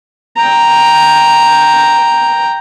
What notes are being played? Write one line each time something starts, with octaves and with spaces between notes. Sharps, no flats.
G5 A#5